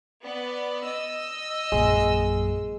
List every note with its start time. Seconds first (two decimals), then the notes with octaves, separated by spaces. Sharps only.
0.23 B3 D5
0.84 D#5 E6
1.72 A#1 F#2 G#3